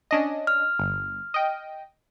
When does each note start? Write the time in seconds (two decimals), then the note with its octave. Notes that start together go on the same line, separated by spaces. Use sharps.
0.11 C#4 D4 D#5
0.47 F6
0.79 G1
1.34 D#5 G5